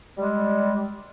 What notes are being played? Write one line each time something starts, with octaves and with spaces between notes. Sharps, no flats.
G3 G#3